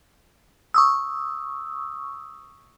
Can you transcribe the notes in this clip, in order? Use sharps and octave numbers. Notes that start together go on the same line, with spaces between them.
C#6 D#6 E6